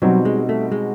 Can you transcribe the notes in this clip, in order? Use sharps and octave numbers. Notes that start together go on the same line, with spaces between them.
B2 F#3 G3 C4 D#4 F#4
G#3
A3
G#3